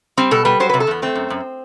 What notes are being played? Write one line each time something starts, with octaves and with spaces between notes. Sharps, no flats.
G3 C4
B2 A4
G3 B4
F#3 C5
C3 B4
A4
E2 B3
A3 C4
F#2
F#2